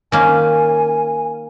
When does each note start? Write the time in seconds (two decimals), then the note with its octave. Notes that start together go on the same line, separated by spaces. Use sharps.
0.12 D#3 A#3 C#4 G#5